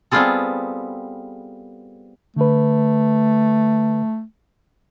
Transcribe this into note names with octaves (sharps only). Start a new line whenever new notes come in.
G3 B3 C4 F4 G#4 A4
D3 A3 B4